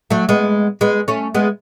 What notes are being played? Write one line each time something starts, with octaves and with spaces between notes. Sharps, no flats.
F#3 A3
G#3 B3
G#3 B3
A3 C#4
G#3 B3